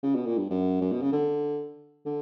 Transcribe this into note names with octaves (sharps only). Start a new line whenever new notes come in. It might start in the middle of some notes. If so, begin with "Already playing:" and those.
C#3
B2
A#2
G2
F#2
F#2
B2
C#3
D3
D3